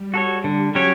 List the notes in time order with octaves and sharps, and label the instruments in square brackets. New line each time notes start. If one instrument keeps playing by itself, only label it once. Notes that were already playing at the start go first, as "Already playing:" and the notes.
Already playing: [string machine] G3
[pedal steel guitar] F#4 A4 C#5
D3
F#3 C#4 G4 C#5